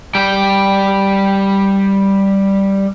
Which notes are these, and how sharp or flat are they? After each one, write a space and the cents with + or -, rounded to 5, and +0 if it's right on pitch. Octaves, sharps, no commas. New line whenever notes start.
G3 +0 G5 +0